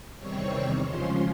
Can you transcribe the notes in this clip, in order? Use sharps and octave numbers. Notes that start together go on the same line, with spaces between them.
E2 C3 D#3 G3 C4 C#5 C#6
C#3 F3 G#3 C#4 F4 C5 C6